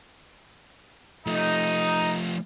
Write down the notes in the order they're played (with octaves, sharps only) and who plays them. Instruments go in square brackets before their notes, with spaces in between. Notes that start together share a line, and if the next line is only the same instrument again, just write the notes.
[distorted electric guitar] F3 A3 [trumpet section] D#4